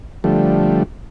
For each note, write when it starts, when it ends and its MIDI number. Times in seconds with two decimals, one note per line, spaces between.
0.24 0.83 50
0.24 0.83 53
0.24 0.83 55
0.24 0.83 57